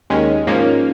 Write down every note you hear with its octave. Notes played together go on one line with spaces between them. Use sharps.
D#2 D#3 G#3 C#4
G#2 F3 A#3 C#4